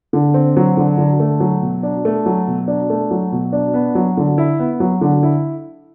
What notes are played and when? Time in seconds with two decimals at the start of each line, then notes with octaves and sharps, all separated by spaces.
0.13 D3
0.34 C4
0.57 F#3
0.77 D3
0.98 D3
1.20 A3
1.40 F#3
1.62 B2
1.83 D4
2.05 A3
2.26 F#3
2.48 B2
2.68 D4
2.90 A3
3.11 F#3
3.32 B2
3.52 D4
3.74 B3
3.95 F#3
4.17 D3
4.38 E4
4.60 B3
4.80 F#3
5.01 D3
5.23 E4